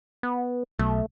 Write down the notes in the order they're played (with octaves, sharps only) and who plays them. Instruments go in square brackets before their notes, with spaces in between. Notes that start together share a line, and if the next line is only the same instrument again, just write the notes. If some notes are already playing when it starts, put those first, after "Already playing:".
[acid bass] B3
[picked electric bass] B1 [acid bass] A3